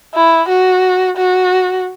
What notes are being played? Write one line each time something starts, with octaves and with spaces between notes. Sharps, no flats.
E4
F#4
F#4